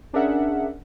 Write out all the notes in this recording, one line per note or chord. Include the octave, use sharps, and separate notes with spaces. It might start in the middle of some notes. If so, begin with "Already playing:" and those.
C#4 D4 G#4 A#4 E5 F#5